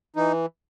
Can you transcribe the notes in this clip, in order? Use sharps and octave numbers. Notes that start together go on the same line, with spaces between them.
E3 D#4